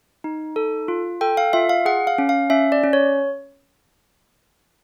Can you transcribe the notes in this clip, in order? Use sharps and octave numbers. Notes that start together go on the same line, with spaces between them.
D#4
A4
F4
A4 G5
F5
F4 E5
F5
G#4 F#5
F5
C#4
F5
C#4 E5
D5
C#4
C#5